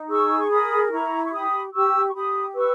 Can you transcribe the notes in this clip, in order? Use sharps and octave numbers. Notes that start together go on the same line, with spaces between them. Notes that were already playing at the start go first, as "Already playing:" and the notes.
Already playing: D#4
G#4 C#6 E6
C#6
A#4 B5 D#6
E4 A#5 C#6
C#6
G4 B5 D#6
G4 C#6 E6
C#6
G4 B5 D#6
B4 C#6 E6